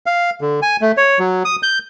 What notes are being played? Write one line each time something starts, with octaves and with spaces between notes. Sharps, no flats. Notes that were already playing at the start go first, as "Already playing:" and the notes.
F5
D3
G#5
A3
C#5
F#3
D#6
G6